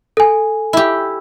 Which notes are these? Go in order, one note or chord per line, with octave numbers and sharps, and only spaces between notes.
A4 G#5
E4 G4